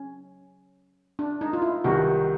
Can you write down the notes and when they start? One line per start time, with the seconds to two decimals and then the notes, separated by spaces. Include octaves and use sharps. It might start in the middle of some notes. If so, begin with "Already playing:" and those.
Already playing: C#4
1.19 D4
1.41 D#4
1.53 F4
1.62 E4
1.84 C2 C3 D#3 G3 F#4